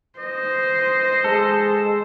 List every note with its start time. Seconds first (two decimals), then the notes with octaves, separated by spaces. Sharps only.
0.19 C5 D#5
1.24 G#3 A4